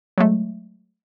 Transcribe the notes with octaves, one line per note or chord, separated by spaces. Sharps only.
F#3 G#3 A3